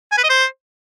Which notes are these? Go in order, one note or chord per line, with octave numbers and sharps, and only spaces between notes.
G#5
B4
D#5
C5